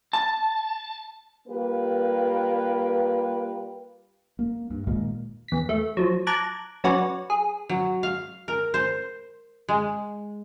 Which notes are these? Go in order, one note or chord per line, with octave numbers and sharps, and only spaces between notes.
A5
G3 A#3 F4 G4 B4
A#3
G2
A#2 D#3 G#3 A#3
E2 B6
A3
F3 F#3
A5 A#5 D6 F#6 G#6
F#3 C#4 F#4 B4 D5
G#4
F#3
F5
A#4
C5
G#3